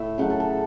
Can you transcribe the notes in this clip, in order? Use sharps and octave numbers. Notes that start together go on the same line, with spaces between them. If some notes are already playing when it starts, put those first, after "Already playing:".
Already playing: A2 E5
C#3 F#3 A3 F#5
A4
A4